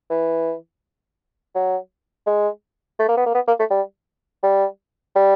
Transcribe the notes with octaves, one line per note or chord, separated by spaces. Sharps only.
E3
F#3
G#3
A3
A#3
B3
A#3
B3
A#3
A3
G3
G3
G3